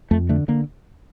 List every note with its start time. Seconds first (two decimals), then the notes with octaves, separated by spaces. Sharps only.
0.11 F2 A3
0.29 D3 A3
0.48 D3 A#3